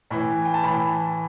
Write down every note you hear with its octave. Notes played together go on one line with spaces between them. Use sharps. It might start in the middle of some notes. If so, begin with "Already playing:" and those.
A2 E3
G5
A5
A2 E3 B5